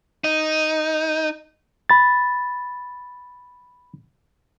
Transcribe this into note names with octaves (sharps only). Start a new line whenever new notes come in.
D#4
B5 A6